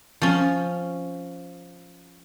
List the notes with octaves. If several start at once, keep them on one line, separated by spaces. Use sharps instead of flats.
F3 C#4